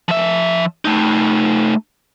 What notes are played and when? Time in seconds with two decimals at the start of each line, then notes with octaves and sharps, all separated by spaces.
0.08 F3 E5
0.85 A3 D#4